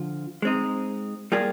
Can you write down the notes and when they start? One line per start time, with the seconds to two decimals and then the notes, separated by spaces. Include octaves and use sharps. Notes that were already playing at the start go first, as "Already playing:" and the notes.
Already playing: D3 F3 F4
0.42 G#3 C4 D#4
1.32 G3 A#3 F4 G#4